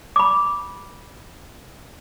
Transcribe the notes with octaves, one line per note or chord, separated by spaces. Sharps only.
B5 D6